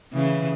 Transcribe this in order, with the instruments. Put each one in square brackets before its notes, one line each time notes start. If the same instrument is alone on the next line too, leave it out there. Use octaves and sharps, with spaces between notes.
[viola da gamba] C#3 E3